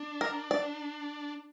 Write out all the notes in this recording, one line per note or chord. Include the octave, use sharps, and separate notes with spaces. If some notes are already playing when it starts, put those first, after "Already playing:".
Already playing: D4
A#4
D5